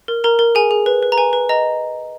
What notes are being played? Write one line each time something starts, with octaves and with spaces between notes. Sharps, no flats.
A#4
A#4 A#5
A#4
G#4 G#5
G#4
B4
B4
A#5
B4 G#5
B4
D#5 A#5